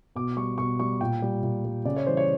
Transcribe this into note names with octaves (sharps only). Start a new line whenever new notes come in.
B2 D6
G3 C#6
B2 C#6
G3 C#6
A#2 G5
G3
A#2
G3
C#3 D5
C#5
E3 G3 C5
C#5